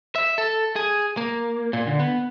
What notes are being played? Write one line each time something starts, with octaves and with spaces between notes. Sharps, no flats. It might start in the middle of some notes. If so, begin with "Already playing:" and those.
E5
A4
G#4
A#3
A#2
D3
B3